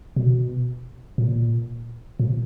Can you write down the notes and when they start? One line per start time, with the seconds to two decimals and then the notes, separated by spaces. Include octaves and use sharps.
0.16 B2
1.18 A#2
2.20 A#2